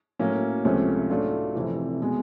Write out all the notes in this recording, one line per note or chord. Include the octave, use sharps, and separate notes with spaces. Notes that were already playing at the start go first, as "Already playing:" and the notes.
A2 F#3 A#3 C#4
C#2 C3 F3 A3 C#4
A2 F#3 A3 D4 F4
F1 F2 C3 E3
B2 G#3